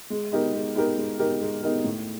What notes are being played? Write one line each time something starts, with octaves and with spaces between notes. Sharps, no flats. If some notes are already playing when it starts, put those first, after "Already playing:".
G#3
B3 D#4 G4 A#4
G#3
B3 D#4 G4 A#4
G#3
B3 D#4 G4 A#4
G#3
B3 D#4 G4 A#4
A2